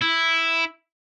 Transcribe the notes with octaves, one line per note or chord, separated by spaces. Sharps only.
E4